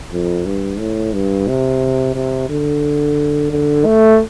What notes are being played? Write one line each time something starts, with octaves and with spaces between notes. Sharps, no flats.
F2
G2
A2
G2
C3
C3
D3
D3
A3